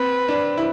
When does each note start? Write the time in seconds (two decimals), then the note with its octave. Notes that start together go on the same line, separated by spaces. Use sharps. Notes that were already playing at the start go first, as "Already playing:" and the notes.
Already playing: C4 B4
0.28 D4
0.57 E4